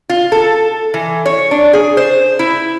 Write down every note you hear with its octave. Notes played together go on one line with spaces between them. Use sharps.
F4
A4
E3
C#5
D4
G#4
C5
E4